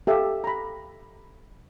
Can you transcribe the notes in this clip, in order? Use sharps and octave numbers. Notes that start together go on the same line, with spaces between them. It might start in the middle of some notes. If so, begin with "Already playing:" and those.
G4 A4 E5 F5
A#5 B5